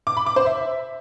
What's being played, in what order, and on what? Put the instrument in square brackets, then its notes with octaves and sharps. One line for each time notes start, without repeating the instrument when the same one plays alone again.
[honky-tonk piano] D6
B5
D6
C5
E5